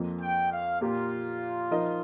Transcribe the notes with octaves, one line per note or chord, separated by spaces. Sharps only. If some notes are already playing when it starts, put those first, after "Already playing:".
Already playing: F2 F3 A#3
G5
F5
A#2 A#3 F4 G4
F3 D#4 A#4 D#5